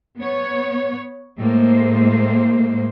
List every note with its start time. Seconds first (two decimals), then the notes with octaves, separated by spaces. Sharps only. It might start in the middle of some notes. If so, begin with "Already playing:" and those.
0.19 B3 C#5
1.38 A2 G#3 A#3 C5